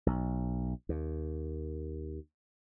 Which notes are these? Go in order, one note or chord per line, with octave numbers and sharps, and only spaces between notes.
B1
D#2